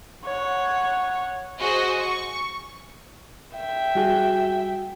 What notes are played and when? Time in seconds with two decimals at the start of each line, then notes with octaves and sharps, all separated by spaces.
0.24 C#5 F#5
1.59 F#4 G#4 C5 D#5
1.98 C#6
3.54 E5 G5
3.95 G3 F#4 G#4